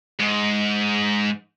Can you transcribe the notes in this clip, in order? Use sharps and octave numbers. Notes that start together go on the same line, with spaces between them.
G#2